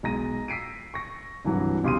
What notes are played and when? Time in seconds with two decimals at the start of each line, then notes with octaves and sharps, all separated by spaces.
0.03 B1 G#3 A#5 A#6 D#7
0.48 E6 B6 C7 D7 D#7
0.94 C#6 A#6
1.44 C2 G2 E3 F#3
1.84 B1 C#3 G4 C6 D#6 D#7